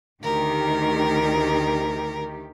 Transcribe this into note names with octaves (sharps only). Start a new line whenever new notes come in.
D2 D#3 G4 A#4